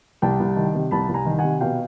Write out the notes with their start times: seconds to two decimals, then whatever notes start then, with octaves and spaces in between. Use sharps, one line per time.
0.22 C2 G5 A5
0.40 C2
0.56 D#3
0.75 C3
0.91 C2 A5 B5
1.09 C2
1.14 G#5 A#5
1.26 D#3
1.39 F#5 G#5
1.44 C3
1.61 B2 F5 G5